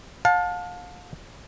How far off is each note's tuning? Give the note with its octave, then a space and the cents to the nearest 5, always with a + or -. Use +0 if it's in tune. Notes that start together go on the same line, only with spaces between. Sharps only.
F5 +40 A5 +0